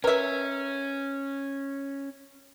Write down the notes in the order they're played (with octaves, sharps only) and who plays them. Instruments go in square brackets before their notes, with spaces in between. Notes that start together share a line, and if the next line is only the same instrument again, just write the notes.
[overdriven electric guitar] C#4 [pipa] A#4 E5 [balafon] B4